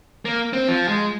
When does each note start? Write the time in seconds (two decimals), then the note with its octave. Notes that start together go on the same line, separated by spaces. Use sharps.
0.25 A#3
0.53 C4
0.68 F3
0.88 G#3